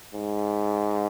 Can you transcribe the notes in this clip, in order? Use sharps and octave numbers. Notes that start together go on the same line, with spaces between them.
G#2